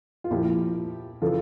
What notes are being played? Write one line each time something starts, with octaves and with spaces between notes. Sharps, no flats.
F4
A#2 F3 E4 G4
C#3 E3 F4 A4